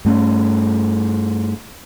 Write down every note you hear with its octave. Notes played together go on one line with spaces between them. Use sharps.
G2 A3 C#4